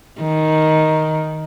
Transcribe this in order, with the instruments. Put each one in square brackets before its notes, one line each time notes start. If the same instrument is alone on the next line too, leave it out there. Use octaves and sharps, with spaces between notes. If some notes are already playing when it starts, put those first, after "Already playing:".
[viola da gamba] D#3